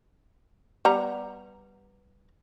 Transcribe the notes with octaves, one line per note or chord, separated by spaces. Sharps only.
G3 B3 A#5